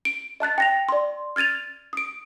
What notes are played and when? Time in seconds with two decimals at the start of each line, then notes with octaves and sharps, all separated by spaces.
0.05 D7
0.40 D#5 A5 F#6 A6
0.58 G5 A#6 F7
0.89 D5 C6
1.36 F6 G#6 A6 D#7 F7
1.93 D#6 D7